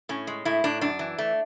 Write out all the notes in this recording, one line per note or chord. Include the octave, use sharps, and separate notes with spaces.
A2 C#4
G#3
A2 E4
A2 D4
F#2 D4
E3
A3